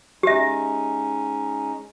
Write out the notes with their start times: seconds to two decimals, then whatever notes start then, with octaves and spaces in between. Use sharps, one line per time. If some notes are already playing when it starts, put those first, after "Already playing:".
0.23 G#3 C#4 D#4 G4 E5